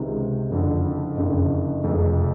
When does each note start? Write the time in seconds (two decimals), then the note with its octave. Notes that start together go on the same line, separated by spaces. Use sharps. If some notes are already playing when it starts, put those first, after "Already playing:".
Already playing: C#2 C3 D#3
0.49 F#1 F2 D3
1.17 F#1 F2 D3
1.84 F1 F2 C#3